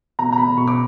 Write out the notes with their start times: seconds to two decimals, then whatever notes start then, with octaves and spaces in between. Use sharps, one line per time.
0.19 B2 A#5
0.32 A#5
0.38 B2 B5
0.57 B2 C#6
0.67 D6